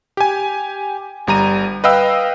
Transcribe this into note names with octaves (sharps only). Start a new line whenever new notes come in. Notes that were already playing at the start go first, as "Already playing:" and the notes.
G4 G#5
G1 G3 A#5 D#7
B4 D#5 F5 G5 E6